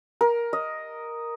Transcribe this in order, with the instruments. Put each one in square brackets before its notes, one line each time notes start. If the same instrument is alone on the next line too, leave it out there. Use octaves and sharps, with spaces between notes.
[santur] A#4
D#5